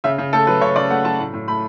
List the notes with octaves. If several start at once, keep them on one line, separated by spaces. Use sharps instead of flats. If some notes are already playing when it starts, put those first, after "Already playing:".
C#3 E5
C#3
A3 A4
F#3 B4
C#3 C#5
C#3 D5
A3 F#5
F#3 A5
A2
A2
A3 B5